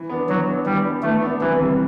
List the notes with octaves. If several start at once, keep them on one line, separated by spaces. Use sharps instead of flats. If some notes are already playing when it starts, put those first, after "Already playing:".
Already playing: E3
B3 D4
E3 F#3
B3 D4
E3 G3
B3 D4
E3 A3
B3 D4
C2 E3
C3 E3 G3